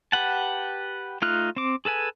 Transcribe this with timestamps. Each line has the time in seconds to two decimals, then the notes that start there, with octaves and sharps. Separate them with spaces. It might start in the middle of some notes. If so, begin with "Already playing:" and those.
0.12 G4 B4 F#5 A5
1.22 A3 D#4 F4 F6 F#6
1.56 C4 D6
1.85 G#4 A4 B4 G#5